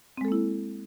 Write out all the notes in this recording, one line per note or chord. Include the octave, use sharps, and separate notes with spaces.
G#3 A#3 C4 E4 A4